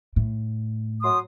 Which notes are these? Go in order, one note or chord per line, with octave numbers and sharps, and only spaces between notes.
A2
F#3 C6 D#6